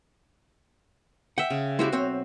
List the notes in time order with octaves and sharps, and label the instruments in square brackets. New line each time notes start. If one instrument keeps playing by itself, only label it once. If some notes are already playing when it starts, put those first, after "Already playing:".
[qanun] E5 G5 [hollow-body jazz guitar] F#5
[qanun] C#3
[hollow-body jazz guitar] G#3 E4 G4 [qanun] F#4 C5
[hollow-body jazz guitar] B1 C4 C#5